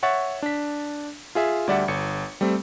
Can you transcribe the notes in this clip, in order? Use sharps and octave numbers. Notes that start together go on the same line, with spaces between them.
C#5 E5 F#5 C#6 A6
D4 B6
F4 G#4 E5
D2 G3 D5 E5 F#5
G1 C#7
G3 A3 C4